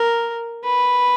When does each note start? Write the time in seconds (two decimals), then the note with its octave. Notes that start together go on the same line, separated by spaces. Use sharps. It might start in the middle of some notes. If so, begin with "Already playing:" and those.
Already playing: A#4
0.64 B4